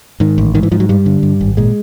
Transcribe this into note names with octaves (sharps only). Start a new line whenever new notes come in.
G#2 D#3
A1
G#2 D#3
E3
G#2 F3
F#3
G2 G3
D3
G2
G#1
A#2 G#3